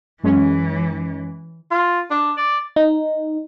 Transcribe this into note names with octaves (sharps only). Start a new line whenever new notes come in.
F#2 E3 G#3 C#4
F4
D4
D5
D#4